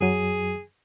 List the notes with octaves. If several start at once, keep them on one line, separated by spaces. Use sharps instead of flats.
F#2 F#3 G#4